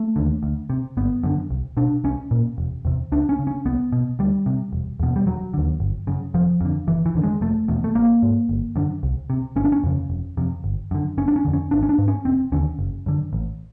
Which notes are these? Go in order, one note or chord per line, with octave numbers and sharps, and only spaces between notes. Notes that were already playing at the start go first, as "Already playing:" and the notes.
Already playing: A3
D#2 D3
D2
C3
G1 B3
F#2 D3
C2
B2 D4
C2 C#4
A#2
E1
E2 C3
C#2 D4
C#4
C#3
C#4
C2 B3
B2
D2 G3
C3
E1
E2 B2
G3
E1 F#3
D#2 D3
G1
F#2 C#3
F1 F3
F2 D3
F#1 E3
E3
F2 D3
G#3
F1 A3
E2 B2
A3
A1 A#3
G#2
G1
F#2 D3
C2
C3
G1 C#4
D4
C#4
F2 C#3
F1
F2 C3
G1
F#2 D3
F#1 C#4
D4
C#4
F2 D3
C#4
G#1 D4
C#4
D4
G#2
C#4
E1 C4
D#2 D3 C#4
F#1
F#2 D3
A1